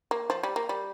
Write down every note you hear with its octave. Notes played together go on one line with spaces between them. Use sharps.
A#3
F3
G3
A#3
G3